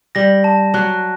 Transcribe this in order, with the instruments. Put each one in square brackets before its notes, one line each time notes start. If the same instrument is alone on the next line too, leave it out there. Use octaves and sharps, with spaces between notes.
[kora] G3 [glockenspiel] A#6
[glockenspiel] A5
[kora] F#3 [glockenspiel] F#6